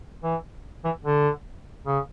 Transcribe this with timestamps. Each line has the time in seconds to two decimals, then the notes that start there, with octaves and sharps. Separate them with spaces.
0.23 E3
0.84 E3
1.04 D3
1.87 C#3